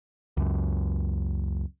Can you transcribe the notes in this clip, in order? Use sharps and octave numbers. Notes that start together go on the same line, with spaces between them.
C#2 F#2